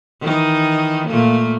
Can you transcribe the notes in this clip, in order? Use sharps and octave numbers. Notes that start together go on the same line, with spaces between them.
D#3 E3 D#4
A#2 A3 A#3